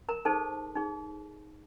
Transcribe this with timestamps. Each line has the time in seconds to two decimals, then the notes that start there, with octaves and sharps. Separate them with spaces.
0.09 A#4 A#5
0.25 D#4 G#4 A4 C5 A5
0.75 D#4 G#4